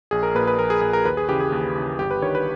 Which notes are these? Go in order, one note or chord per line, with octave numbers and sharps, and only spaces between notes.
A#1 G#4
A#4
A#2 B4
B4
A#1 A#4
G#4
A#2 G#4
A#4
D#2 B4
G#4
C#3 E3 G4
G#4
D#2
C#3 E3
G1 G4
B4
G2 D#3 C#5
B4